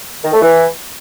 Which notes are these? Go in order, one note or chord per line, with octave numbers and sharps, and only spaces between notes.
D#3
A3
E3